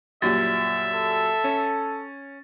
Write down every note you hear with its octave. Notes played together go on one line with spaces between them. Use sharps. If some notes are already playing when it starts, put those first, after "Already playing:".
F#2 A#2 G3 E5 A6
A4
C#4